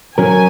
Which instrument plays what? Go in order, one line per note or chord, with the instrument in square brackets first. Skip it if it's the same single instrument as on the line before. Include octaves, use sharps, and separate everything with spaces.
[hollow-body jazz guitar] F#3 C#4 A#4 [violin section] G#5